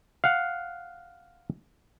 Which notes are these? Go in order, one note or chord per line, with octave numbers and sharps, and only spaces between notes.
F5 F#5